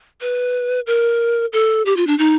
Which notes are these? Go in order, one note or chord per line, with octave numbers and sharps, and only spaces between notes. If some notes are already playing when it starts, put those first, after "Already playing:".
B4
A#4
A4
G4
F4
D4
D#4